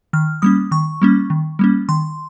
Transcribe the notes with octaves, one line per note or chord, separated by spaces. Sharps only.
D#3 F6
G3 A#3 C#4 D#6
D#3 C#6
G3 A#3 C#4
D#3
G3 A#3 C#4
D#3 C6